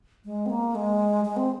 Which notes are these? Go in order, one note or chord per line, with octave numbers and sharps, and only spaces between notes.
G#3
C4
A#3
G#3
G#3
C4